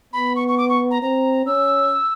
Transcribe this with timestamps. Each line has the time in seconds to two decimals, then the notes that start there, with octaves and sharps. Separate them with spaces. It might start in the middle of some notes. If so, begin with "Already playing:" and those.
0.13 B3 B5
0.36 C#6
0.48 C#6
0.58 D6
0.69 C#6
0.91 A#5
1.02 C4 A#5
1.46 C#4 E6